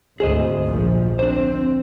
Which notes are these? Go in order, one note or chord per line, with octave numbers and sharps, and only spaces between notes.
G#1 D2 G#4 C5 D#5
A#1 F3
C4 D4 C5